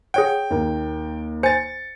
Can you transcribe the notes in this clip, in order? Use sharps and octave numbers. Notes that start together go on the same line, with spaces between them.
G#4 C#5 F#5 G5
D#2 A#3
C5 G#5 A6 C#7